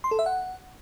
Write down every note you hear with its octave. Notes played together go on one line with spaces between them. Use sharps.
C6
A4
E5
F#5